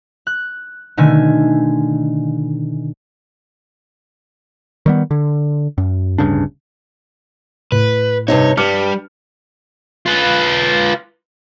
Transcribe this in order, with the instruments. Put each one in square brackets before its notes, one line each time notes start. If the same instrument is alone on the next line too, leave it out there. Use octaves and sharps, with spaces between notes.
[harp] F#6
B2 D3 D#3 A3 G#5
[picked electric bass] D#3 G3 B3
D3
F#2
D1 G2 C#3 D4
[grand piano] A2 [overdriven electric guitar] B4
[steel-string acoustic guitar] G2 C3 D#4 [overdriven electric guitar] C#5
[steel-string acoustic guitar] G2 [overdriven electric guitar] G3 [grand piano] D6 F6 C#7
[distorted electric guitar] F4 B4